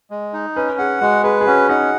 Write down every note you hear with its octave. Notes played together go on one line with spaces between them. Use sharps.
G#3
D#4
C#4 B4
G#4 F#5
G#3 F#4
G#4 B4
G#4
C#4 F#4
D#4 F#5